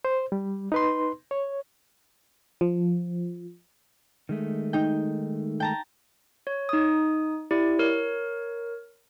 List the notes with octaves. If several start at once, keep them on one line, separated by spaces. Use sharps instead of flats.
C5
G3
D#4 B4 C6
C#5
F3
D#3 G#3 A3
D#4 G5
G5 A5 A#5
C#5
D#4 D#6
E4 G4 D5
A#4 C#5